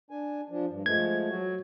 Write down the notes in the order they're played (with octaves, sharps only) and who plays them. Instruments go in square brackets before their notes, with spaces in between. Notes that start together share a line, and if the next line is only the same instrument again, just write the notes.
[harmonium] D4 G#5
F3 D4
G2
[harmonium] F3 G#3 A3 [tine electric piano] G#6
[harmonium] F#3 F#4